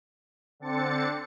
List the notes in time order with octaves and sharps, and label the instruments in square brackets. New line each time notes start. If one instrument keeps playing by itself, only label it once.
[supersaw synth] D3 C4 D4 A6 C#7